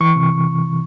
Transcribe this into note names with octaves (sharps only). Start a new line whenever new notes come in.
E3 C#6
C3